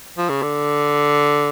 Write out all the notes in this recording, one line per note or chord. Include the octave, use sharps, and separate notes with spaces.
F3
C#3
D3